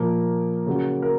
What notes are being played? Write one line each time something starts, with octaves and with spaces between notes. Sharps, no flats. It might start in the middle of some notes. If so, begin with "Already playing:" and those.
Already playing: A#2 F3 A#3 A#4
C#3 F#3
A#4